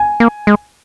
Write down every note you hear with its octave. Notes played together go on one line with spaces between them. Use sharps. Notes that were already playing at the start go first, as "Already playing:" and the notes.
Already playing: G#5
A#3
G#3